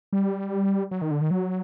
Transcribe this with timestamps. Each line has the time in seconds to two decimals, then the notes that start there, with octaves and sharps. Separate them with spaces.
0.13 G3
0.91 F#3
1.02 D#3
1.11 D3
1.21 D#3
1.31 F#3